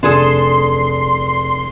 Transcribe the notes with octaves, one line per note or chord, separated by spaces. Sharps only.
F1 D4 G#4 A4 C6 D#6